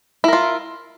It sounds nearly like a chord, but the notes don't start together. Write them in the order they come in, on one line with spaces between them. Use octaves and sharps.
E4 A#4 F4